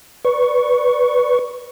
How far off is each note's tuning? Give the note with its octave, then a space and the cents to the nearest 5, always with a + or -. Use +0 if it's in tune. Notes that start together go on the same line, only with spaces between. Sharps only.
B4 +0 D5 -10 C#6 +0